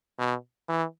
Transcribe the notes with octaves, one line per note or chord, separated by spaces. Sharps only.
B2
E3